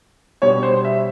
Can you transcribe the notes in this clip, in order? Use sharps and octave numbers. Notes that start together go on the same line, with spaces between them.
B2 G3 B3 D4 C#5
C5
E5